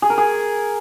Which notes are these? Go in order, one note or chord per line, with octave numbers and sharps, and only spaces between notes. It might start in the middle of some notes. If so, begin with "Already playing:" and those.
G#4
A#4
G#4